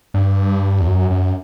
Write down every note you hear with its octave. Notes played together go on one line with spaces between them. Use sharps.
G2
E2
F#2
F#2